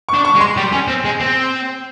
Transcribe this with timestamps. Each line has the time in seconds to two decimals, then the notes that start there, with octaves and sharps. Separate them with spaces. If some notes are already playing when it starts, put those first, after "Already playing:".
0.09 C#6
0.14 D4
0.25 C#6
0.35 G#3
0.41 C6
0.57 G3
0.72 C#4
0.88 C4
1.05 G#3
1.20 C4